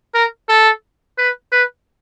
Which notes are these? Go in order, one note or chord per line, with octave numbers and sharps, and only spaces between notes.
A#4
A4
B4
B4